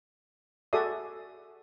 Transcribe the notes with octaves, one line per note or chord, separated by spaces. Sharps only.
F#4 G#4 A4 D5 E5 D#6